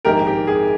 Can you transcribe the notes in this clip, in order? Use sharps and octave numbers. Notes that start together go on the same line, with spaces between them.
A#1 G#2 D#3 A#3 G4 A#4
G4
G#4